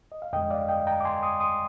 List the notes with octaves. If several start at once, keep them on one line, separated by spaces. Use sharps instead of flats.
D#5
F5
F2 D3 G#3 D#5 G5
D5 F5
D#5 G5
G5 A#5
D6
G#5 C6
C6 D#6
C6 D#6